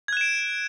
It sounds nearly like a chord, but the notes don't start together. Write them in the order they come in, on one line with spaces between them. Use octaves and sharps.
G#6 F#6 E7 D7